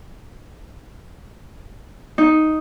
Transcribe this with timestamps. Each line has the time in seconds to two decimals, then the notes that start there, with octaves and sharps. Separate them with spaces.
2.18 D#4